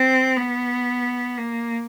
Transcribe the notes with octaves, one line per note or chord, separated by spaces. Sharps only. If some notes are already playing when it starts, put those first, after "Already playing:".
Already playing: C4
B3
A#3